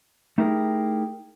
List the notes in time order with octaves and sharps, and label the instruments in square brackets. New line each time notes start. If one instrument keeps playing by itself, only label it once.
[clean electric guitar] A3 D#4 E4 G4 G#4 A#4